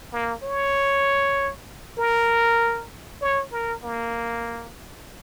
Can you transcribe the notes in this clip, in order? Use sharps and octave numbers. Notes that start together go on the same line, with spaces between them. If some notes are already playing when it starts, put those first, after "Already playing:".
A#3
C#5
A#4
C#5
A#4
A#3